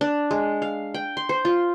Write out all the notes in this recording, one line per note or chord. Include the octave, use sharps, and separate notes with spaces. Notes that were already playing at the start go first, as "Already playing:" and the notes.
D4
G#3
F5
G5
C6
C5
F4